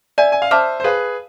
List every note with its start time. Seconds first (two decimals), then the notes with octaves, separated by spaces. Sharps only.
0.18 D5 E5 G#5
0.32 G#5
0.42 F5
0.51 C5 E5 A5 D6 F6
0.80 C5
0.84 G#4 B4 F5